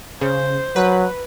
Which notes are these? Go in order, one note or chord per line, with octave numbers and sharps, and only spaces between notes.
C#3 C5
F#3 B4